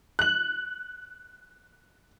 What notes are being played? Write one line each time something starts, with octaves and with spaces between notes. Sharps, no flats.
F#6 F#7